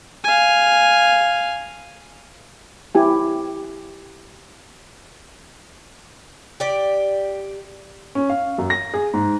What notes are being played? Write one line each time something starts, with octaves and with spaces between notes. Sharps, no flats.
F5 G#5
E4 G4 G#5
G4 D5
C#4
F5
F#2
A#6
G#4
G#2